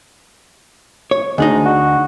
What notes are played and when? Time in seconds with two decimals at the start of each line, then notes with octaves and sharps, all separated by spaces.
1.11 C#5
1.38 D2 G#3 D4 D#4
1.66 F#4